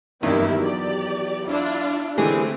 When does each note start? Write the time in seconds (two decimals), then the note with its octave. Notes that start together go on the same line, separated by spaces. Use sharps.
0.23 F#1 E2 G2 D#3 E4 G4
0.59 F#3 G4 D5
1.48 D4 E4 F4
2.18 D3 E3 G#3 A3 C4 G4 G#4